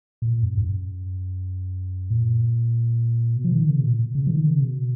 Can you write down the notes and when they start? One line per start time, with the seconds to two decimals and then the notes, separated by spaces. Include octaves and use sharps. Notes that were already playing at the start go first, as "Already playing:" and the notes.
0.22 A#2
0.43 F#2
0.57 G#2
0.64 F#2
2.10 A#2
3.37 B2
3.45 F3
3.52 D#3
3.68 C#3
3.79 B2
3.83 A#2
4.15 C#3
4.27 F3
4.31 D#3
4.47 C#3
4.62 B2